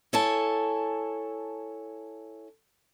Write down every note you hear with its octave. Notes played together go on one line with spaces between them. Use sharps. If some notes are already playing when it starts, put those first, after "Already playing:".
E4 A4 C#5 G#5 A5